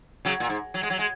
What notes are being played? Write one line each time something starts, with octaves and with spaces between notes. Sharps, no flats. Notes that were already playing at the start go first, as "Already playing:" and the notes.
C#3 F#3
A#2
G#2
F#3
G#3
F#3
G#3